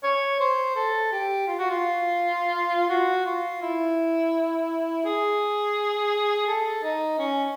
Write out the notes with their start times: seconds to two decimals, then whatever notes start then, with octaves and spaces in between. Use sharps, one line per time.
0.04 C#5
0.40 C5
0.76 A4
1.12 G4
1.47 F4
1.59 F#4
1.70 F4
2.90 F#4
3.26 F4
3.62 E4
5.05 G#4
6.47 A4
6.83 D#4
7.19 C#4